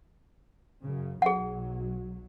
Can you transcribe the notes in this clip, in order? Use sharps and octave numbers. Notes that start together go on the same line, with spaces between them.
F#2 C#3
B1 F#3 G#4 F#5